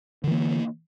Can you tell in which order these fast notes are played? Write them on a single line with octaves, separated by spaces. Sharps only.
D3 E3 A#3